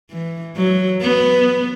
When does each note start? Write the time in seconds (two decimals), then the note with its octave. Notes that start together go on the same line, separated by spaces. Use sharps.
0.11 E3
0.57 F#3
1.02 B3